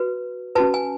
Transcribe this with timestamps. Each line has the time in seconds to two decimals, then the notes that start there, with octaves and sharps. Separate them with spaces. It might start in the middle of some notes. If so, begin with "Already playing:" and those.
Already playing: F#4 B4
0.55 C#4 F#4 B4 A5
0.74 G#5